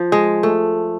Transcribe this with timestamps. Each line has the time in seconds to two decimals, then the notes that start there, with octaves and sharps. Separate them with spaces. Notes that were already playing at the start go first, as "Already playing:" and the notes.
Already playing: F3
0.12 G#3
0.43 A3